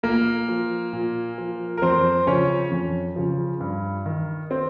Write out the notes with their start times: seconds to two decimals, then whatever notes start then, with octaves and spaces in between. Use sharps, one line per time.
0.03 A#2 A#3 A#4
0.49 F3
0.93 A#2
1.38 F3
1.77 A#4
1.82 F2 C4 C5
2.27 C#3 F3 C#4 C#5
2.71 F2
3.16 C#3 F3
3.60 G2
4.06 D#3
4.51 C4